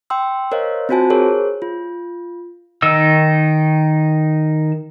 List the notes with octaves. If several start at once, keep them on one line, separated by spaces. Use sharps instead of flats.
G5 C6 E6
A#4 C5 C#5 D#5 F5
C4 F4 F#4 C5 G#5 A5
G#4 A#4 C5 C#5
F4
D#3 D#4 E6